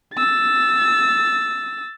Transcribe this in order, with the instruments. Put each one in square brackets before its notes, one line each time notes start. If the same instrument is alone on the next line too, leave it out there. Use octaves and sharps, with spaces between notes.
[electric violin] E6 A6